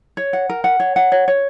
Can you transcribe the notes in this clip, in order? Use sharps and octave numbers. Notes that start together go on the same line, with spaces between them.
C#5
F#5
A#4
F#5
C#5
F#5
C#5
C#5